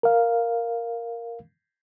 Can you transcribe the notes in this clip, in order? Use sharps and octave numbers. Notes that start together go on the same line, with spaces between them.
A#4 F5